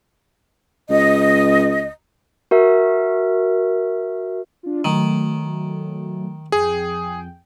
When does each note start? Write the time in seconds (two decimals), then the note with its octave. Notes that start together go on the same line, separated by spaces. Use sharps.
0.90 C#2 D#5
2.51 F#4 A#4 E5
4.63 D4 F4
4.85 D#3 F#3 A3
6.52 F2 G#4 G5